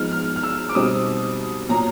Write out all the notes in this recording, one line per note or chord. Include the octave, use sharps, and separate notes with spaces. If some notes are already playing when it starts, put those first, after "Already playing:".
Already playing: F3 G#3 B3 D#4 F6
F6
F6
E6
D6
B2 G3 C4 D#4 D#6
A#2 F#3 A#3 A#5